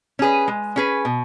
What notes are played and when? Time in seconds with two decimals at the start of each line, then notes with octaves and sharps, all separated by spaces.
0.19 C#4 G#4 B4
0.48 G#3
0.76 C#4 G#4 B4
1.05 B2